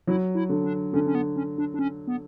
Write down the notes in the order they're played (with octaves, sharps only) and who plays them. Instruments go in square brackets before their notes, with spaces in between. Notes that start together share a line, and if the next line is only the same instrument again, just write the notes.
[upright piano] F#3 [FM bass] E4
[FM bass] E4
[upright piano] D3
[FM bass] D4
[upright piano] D3 [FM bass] C#4
[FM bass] C#4
B3
C#4
D4
D4
C#4
B3